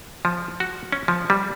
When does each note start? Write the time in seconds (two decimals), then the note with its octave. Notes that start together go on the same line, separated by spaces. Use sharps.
0.25 F3
0.60 F#4
0.92 C#4
1.08 F3
1.30 G3